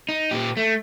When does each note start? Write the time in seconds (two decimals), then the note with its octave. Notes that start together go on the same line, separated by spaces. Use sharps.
0.09 D#4
0.31 A#2 G4
0.57 A3